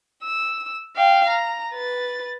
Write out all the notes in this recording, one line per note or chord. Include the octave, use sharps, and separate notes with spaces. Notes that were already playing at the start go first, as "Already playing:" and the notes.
E6
F5 G5
A#5
B4 A6